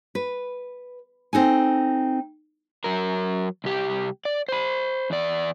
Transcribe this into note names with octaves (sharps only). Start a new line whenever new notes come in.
B4
C4 D#4 A4 G#5
F#3 A#4
C2 G4
D5
C5 B5
E2 D5